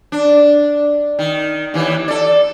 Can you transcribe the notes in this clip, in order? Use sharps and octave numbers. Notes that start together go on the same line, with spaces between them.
D4
D#3
D#2 E3
A4 D5